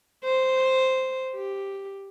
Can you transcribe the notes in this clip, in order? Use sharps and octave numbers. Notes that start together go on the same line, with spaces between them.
C5
G4